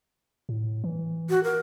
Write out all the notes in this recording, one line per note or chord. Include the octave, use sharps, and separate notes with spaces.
A2
E3
F#4
A#4